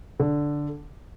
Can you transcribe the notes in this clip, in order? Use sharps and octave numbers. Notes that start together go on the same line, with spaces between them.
D3